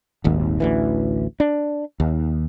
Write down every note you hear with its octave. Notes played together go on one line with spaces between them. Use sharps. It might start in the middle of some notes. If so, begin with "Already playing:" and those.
D#1 G#1 D#2
A1 D2 E3
D4
D#2